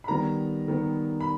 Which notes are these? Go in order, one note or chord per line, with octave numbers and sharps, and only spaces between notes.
B5
D#3 G3 B3 A#5
D#3 G3 B3
B5